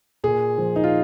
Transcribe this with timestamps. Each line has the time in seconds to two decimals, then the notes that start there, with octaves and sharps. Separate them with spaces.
0.24 A#2 G#4
0.58 F3
0.76 D#4
0.84 F4